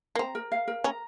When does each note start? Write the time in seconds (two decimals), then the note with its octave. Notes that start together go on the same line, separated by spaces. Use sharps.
0.15 A#3
0.19 C4 A#5
0.35 A#4
0.52 F5
0.68 A#4
0.84 C#4 A#5